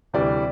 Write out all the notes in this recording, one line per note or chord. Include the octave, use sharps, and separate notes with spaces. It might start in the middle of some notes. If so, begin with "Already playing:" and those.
D2 C3 E3 G3 D5